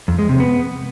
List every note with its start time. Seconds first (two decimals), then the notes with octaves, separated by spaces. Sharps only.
0.08 F2
0.19 G#3
0.29 C3
0.40 B3